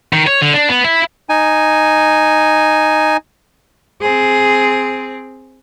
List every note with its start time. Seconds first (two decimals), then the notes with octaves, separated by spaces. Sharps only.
0.13 D#3
0.27 C#5
0.41 D3
0.54 D4
0.69 B3
0.84 E4
1.29 D#4 G#5
4.01 C4 G#4